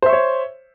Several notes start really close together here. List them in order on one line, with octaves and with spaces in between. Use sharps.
C5 E5 C#6 C#5